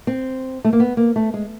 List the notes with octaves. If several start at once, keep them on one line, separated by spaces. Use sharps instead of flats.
C4
A3
A#3
B3
A#3
A3
G#3